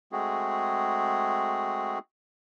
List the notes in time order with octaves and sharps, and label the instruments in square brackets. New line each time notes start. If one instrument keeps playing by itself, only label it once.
[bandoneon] G#3 A3 C4 F#4 G#4